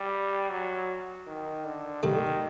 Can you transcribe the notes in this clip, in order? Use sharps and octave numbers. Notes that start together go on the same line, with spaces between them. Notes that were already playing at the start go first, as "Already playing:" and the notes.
Already playing: G3
F#3
D#3
D3
D#3 G3 A3